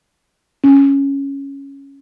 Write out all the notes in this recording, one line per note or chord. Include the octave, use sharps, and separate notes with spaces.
C#4